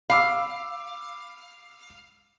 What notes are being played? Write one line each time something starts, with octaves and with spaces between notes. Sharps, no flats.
F5 B5 D6 E6